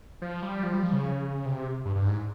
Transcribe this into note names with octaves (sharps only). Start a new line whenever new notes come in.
F3
G3
F3
G3
F3
C#3
C3
G2
G2
G#2